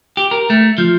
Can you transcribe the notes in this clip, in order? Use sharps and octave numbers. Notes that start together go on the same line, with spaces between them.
G4
A#4
A3
F3